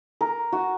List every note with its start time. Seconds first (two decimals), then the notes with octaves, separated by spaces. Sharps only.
0.21 A#4
0.52 F#4